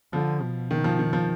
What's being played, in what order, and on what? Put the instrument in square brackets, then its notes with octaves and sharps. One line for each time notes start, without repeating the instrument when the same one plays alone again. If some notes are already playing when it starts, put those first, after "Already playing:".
[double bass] D3 [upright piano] F3
[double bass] B2
[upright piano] D#3
F3
D#3
F3